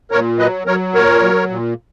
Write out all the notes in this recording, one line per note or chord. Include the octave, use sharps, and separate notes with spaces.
A#2 A#4 C#5
F#3 B4 D#5
F#3 A#4 C#5
A#2 A#4 C#5
F#3
A#2